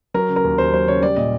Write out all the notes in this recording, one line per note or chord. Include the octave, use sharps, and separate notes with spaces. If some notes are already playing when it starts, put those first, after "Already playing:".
F#3 A#4
C#3
A#4
D#2
D#2 C5
F#3 C5
C#3 C#5
G3 D5
A#2 D#5